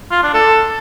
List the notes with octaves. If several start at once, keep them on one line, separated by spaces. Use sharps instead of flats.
F4
D4
A4